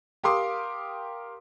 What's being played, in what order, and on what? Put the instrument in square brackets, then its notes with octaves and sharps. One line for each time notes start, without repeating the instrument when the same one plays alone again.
[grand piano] G4 A#4 F5 C6 D6 D#6